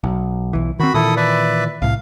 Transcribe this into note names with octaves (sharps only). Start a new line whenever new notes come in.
B1
B1 E3
D#3 C4 F#4 B5
A#2 D#3 E3 E4 A4 D#6
B4 D5 E5
C2 A2 F5